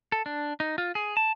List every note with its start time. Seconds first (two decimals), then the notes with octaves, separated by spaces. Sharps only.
0.12 A4
0.26 D4
0.60 D#4
0.78 F4
0.95 G#4
1.17 A5